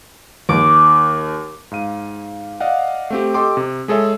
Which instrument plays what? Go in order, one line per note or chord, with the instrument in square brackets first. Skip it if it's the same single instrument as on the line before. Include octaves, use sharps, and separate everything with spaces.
[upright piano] D#2 [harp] D6
[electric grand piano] G#2 F5 D#7
D5 D#5 F5 F#5
A3 C4 G4
G4 A4 D#5 G5 C6 D6
C3
G#3 G#4 A4 C#5 E5